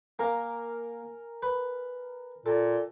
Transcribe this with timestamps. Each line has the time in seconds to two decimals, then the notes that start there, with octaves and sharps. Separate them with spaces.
0.19 A#3 A#4 G#5 A#5
1.42 B4
2.46 A#2 A4